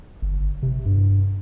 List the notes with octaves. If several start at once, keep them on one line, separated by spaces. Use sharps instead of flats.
G1
C3
G2